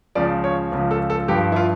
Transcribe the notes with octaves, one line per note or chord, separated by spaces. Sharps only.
C#2 C#3 F3 D5
C#5
C#2 C#3 F3
A4
A4
G2 F3 G4
E4
F4